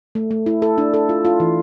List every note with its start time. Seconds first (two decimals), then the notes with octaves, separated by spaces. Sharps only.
0.15 A3
0.31 A3
0.46 E4
0.62 A4
0.78 D4
0.94 A4
1.09 F4
1.25 F4
1.40 E3